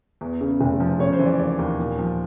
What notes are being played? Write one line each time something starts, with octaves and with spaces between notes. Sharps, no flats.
E2
C#3
F1
F3
C#3 C#5
C5
E3
D5
D#2 D5
D#2
A#2
F3